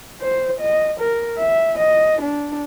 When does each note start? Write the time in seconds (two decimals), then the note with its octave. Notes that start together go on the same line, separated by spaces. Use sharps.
0.21 C5
0.60 D#5
0.99 A#4
1.39 E5
1.78 D#5
2.21 D4